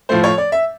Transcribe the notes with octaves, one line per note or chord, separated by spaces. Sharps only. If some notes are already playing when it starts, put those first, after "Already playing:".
A2 F3 A3 C5
C#5
D5
E5